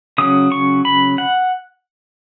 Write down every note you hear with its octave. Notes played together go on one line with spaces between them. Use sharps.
C#3 F#3 C#4 D#6
C#6
B5
F#5